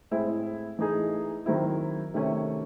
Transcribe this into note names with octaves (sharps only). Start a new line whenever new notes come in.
A2 G#3 C4 E4
E3 A3 D#4 G#4
D#3 F#3 C4 E4
C3 D#3 A3 C#4